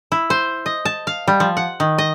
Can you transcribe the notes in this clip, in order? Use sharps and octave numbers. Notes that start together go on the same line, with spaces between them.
E4
C5
D#5
A5
F5
G3
F3
F#5
D#3
D#5